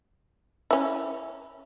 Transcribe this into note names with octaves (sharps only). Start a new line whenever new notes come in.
C#4 E4